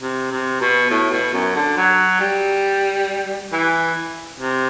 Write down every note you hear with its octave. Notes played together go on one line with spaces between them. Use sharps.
C3
C3
B2
A2
B2
F#2
D3
F#3
G3
E3
C3